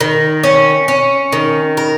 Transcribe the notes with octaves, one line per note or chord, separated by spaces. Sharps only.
D#3
C#4
C#4
D#3
A#4